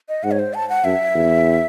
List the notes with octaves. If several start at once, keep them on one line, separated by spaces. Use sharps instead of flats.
D#5
G#2 F#5
C#5
C5
A5
F#5
F#2 E5
E2